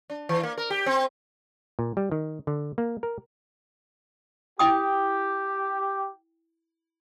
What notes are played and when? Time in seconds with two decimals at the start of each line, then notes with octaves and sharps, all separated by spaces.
0.10 D4
0.29 E3
0.43 A#3
0.58 A#4
0.70 G4
0.86 C4
1.79 A#2
1.97 G3
2.12 D#3
2.47 D3
2.78 A#3
3.03 A#4
4.59 E4 G4 G5 D#6